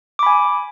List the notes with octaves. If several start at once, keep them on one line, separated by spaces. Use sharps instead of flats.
G#5 B5 D6